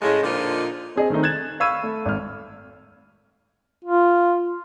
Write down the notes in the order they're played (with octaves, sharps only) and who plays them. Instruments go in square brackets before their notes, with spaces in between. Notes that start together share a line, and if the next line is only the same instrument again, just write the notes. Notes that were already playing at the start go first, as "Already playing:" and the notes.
[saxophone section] A2 C#3 G#3
A#2 D3 F3 A#3 D#4 F4
[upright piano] C4 G#4 D#5
D#3 A3 C4 D#4
F#6 G#6 A6 E7
F5 B5 C#6 E6 G#6 D#7
A3
G#1 F6
[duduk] F4